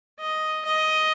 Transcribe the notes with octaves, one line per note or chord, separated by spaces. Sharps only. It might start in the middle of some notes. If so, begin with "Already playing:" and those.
D#5
D#5